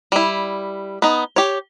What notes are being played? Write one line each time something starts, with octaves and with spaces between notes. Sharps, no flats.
G3 E4
B3 D#4
G4 C#5